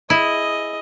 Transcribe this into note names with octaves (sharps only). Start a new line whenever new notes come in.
E4 G#4 D#5